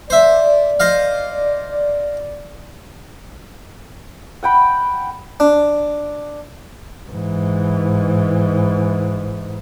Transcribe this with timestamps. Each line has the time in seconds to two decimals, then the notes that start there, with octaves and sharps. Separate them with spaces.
0.10 C5 D5 E5
0.80 C5 D#5 F5
4.43 F#5 G5 B5
5.40 D4
7.11 G#2 E3